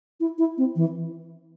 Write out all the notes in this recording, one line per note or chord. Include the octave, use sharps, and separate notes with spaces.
E4
E4
C4
E3